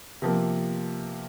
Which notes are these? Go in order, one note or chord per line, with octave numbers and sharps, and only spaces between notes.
C3 F3 A#3